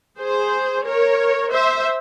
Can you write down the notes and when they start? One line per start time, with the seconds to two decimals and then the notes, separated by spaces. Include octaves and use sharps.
0.19 G#4 C5
0.85 A#4 C#5
1.52 C5 E5